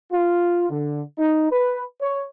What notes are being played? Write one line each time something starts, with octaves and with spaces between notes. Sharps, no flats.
F4
D3
D#4
B4
C#5